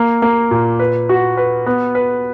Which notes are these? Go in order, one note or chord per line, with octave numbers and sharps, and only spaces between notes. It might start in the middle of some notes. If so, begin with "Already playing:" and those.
Already playing: A#3
A#3
A#2
B4
F#4
B4
B3
B4